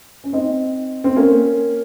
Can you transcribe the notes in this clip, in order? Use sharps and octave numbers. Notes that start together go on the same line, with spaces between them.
C#4
C4 D#4
C4
A#3 C#4